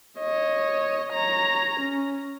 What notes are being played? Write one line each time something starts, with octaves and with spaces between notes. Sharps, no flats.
C#5 D#5
C#5 A#5
C#4